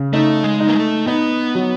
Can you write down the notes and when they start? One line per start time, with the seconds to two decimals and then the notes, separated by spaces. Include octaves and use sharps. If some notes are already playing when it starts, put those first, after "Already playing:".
Already playing: C#3
0.13 A3 D#4
0.44 G#3
0.60 D#4
0.67 A#3
0.76 A3
1.07 B3 D#4
1.55 F#3